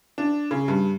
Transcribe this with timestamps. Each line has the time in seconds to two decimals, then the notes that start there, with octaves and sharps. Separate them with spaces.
0.18 D4
0.51 C#3
0.68 G2